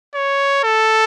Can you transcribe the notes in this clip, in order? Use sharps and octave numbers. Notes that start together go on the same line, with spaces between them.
C#5
A4